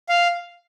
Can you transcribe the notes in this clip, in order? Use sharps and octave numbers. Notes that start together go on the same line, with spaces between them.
F5